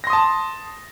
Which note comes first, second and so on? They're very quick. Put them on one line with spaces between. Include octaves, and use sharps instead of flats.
A#6 C6 D#6 A5